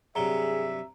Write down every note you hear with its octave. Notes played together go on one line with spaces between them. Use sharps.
G2 C3 F#3 G#4 E5 A#5 G7